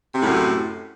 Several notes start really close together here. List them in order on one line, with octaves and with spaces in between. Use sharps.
C3 A2 F#2